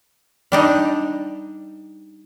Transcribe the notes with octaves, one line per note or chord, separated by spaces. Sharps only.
G3 D4 D#4